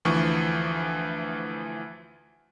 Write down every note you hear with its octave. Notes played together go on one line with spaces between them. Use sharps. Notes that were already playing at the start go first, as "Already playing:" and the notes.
D2 E3 F3 C#6